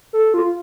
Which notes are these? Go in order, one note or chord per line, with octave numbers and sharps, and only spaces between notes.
A4
F4